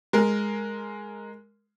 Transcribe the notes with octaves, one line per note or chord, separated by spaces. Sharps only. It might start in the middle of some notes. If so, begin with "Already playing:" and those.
G#3 A#4